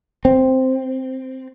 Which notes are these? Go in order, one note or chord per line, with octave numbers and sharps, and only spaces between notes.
C4